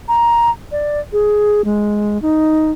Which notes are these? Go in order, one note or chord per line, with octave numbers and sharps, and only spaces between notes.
A#5
D5
G#4
G#3
D#4